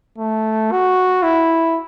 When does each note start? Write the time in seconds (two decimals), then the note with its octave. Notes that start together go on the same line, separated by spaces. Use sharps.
0.18 A3
0.71 F#4
1.23 E4